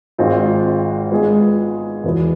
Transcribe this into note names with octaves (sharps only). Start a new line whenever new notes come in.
G#1 G#2 G#3 C4 F4
G#2 G#3 B3 F4 G#4
E2 B2 B3 E4